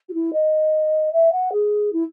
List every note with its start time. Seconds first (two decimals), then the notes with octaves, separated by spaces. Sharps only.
0.09 F#4
0.14 E4
0.33 D#5
1.13 E5
1.32 F#5
1.52 G#4
1.93 E4